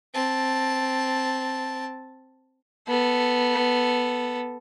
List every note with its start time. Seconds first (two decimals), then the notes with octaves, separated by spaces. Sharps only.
0.14 C4 A5
2.88 B3 A4